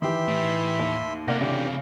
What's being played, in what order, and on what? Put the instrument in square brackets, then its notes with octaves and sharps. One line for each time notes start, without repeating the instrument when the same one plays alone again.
[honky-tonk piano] D#3 G4 [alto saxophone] E3 [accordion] E5 B5 C6
[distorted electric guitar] A2
[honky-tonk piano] D#2
[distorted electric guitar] C3 A3 [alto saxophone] A#3 [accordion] A#4 [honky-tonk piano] D5 F#5 A#6
[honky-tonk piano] C#3 [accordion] E3 G4 [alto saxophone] D4